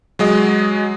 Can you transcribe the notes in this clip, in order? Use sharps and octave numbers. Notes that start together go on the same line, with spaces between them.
F#3 G#3 D#5